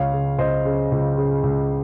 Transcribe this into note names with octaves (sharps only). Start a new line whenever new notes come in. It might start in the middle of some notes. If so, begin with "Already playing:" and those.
Already playing: C#2 C#5 F5
C#3
C#2 C5 D#5
C#3
C#2
C#3
C#2